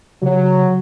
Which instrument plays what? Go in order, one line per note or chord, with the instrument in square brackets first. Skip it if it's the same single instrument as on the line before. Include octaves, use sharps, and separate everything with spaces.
[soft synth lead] C#3 [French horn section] F#3